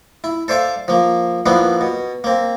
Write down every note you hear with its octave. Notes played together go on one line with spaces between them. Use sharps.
E4
A4 C5 D5 E5 F5
F3 A#3
F3 A#3 B3 D4 E4
B2
A#3 C4